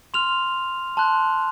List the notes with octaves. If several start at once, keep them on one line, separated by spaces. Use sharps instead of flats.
C6 F6 F7
A5 C6 F#6